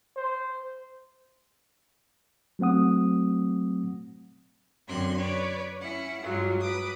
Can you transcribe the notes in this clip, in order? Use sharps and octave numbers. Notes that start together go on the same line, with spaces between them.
C5
F#3 A3 C4 F#5 D#6
F#2 D3 C4 C6 F#6 G#6
B4 C#5 D5
C#4 E4 F#5
G2 F#3 G#3 F4
B4 D6 D#6